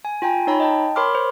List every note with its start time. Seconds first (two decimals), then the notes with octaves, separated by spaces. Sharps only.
0.05 G#5
0.22 F4 G5 G#5 A#5
0.47 D#4 C#5 A#5 B5
0.60 D#5 G5 A5
0.96 A#4 C#5 B5 C6 D6 F6
1.15 C5